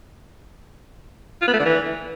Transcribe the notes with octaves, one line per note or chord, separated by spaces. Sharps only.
F4
B3
A3
D3
E3